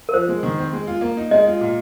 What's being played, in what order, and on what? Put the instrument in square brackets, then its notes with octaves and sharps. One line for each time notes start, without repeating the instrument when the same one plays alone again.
[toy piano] A#4
[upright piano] F3 [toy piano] C5
[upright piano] G#3
D#3
C4
G#3
F4
A#3
D#4
[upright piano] G#3 [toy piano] D#5
[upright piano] F4
A#2